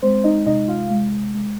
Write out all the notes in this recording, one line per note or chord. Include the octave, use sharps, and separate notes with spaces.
G#3 C4 C5
D#4 D#5
C3 D#4 D#5
F4 F5
G#3
G#3